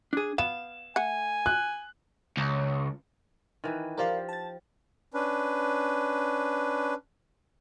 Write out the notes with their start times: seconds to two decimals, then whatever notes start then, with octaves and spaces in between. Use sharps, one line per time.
0.13 D4 G#4
0.38 B3 F5 E7
0.96 A3 F#5 G#5
1.46 F#6
2.37 C#2
3.64 D#3 E3 B4
3.97 F3 G4 A#4 D5 F5
4.29 A5 A6
5.14 C#4 D4 B4